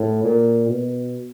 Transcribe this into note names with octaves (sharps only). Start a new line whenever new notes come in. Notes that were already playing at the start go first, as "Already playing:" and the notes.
Already playing: A2
A#2
B2